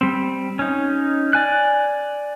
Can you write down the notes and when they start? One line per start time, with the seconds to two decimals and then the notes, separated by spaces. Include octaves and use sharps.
0.01 G3 C4
0.59 C#4 D#4
1.33 D5 G#5 F#6